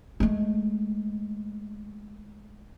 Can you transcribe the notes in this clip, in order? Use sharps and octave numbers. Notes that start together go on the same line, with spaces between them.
G#3 A3